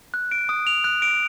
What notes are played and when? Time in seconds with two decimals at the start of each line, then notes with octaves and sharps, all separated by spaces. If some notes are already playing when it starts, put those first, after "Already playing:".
0.14 F#6
0.31 D7
0.49 D#6
0.67 F7
0.84 F#6
1.02 D7